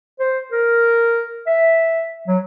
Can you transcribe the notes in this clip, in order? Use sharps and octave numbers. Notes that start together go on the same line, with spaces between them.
C5
A#4
E5
F#3